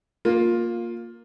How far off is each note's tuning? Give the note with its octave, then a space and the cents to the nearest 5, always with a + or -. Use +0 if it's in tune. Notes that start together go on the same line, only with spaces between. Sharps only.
A#3 +0 F4 +15